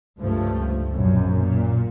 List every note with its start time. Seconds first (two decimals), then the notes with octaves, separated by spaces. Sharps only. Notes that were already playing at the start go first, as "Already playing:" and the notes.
0.20 C#2 G2 F3 A3
0.91 A#1 F#2 B2
1.37 A#2